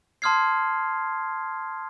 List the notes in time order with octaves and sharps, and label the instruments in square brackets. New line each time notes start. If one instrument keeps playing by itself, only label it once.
[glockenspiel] A5 C6 D#6 F6 G#6 C7